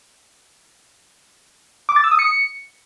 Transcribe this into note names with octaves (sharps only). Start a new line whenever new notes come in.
D6
A6
E6
D#6
C#7